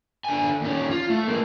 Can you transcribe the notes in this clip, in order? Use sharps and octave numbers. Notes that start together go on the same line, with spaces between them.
D3 G#5
D#2 C#4
F4
A3
G#3 A#3